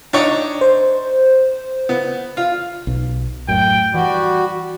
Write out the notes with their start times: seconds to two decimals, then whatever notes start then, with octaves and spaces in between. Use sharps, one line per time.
0.13 D4 D#4 C#5
0.61 C5
1.89 B3
2.37 F4
2.87 B1
3.48 F#2 A2 G5
3.94 E3 G3 F#4